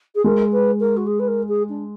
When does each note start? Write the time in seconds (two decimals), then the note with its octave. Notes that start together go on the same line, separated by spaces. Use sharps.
0.15 G#4
0.24 G#3 A#4
0.52 B4
0.80 A#4
0.96 F#4
1.06 G#4
1.19 B4
1.27 A#4
1.48 G#4
1.69 D4